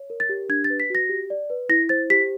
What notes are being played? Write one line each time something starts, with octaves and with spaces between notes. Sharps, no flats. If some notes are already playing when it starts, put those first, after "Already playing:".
Already playing: C#5
A#4
A6
G4
D4 G#6
A6
B4
B6
F#4 A#6
G4
D5
B4
E4 A#6
C5 A6
G4 B6